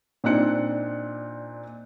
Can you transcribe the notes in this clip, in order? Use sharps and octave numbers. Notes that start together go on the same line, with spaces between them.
A#2 C4 D4 D#4 F#6 C#7